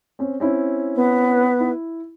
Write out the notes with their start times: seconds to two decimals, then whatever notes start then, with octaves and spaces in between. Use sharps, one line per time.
0.19 C4 C#4
0.40 C4 C#4 E4
0.96 B3
1.60 E4